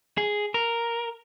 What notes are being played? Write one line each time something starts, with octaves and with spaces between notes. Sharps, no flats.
G#4
A#4